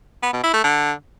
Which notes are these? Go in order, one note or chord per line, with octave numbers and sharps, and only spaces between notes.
B3
B2
E4
A3
D3